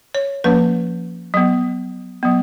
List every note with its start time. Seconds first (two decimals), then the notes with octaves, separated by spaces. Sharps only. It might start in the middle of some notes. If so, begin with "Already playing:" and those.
0.15 C#5
0.44 F3 A#3 C#4 B4
1.34 F#3 B3
2.23 F#3 B3